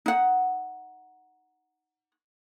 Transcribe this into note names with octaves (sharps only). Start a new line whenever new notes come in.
D#4 F#5